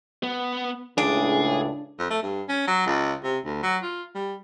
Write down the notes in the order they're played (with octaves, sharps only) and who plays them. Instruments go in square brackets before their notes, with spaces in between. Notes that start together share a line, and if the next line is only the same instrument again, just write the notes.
[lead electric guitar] B3
[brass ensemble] C#2 A2 C#3 [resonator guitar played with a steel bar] D4 [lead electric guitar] G#4
[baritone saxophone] F2
A3
G2
C#4
F#3
C#2
C3
D2
F#3
F4
G3